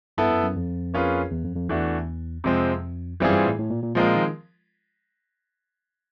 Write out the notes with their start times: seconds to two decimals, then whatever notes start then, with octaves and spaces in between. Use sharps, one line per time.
0.18 G2 B3 E4 A4
0.30 F#2
0.43 F#2
0.56 F2
0.94 A#3 C#4 F4 G#4 B4
1.31 E2
1.44 F2
1.56 F2
1.69 E2 E3 A3 D4 F#4
2.44 F2 C3 F3 G#3 C4
3.20 F#2 E3 G3 C4 F4 G#4
3.32 G2
3.45 A2
3.59 A2
3.70 A#2
3.83 A#2
3.95 A#2 F3 G#3 C4 F4 A#4
4.15 D#3